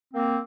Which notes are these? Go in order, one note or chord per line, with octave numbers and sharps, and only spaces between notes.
A#3 C4